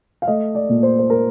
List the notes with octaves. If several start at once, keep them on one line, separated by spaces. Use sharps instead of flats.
F5
A3 D#5
D5
A#2
C5
C5
A#4